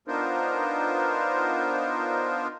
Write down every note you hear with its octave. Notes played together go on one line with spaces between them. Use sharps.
B3 D4 D#4 F4 A#4 C5